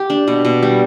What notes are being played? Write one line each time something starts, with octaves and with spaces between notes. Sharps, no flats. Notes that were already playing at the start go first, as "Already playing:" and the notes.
Already playing: G4
D4
B2
B2
G3